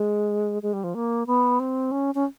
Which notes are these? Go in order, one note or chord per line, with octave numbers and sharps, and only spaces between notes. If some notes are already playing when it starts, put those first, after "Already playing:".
Already playing: G#3
G#3
G3
F3
A#3
B3
C4
C#4
C#4